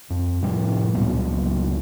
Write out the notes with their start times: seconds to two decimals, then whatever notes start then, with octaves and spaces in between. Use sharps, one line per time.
0.10 F2
0.42 A2 F3 G3
0.95 C#2 A#2 F#3 B3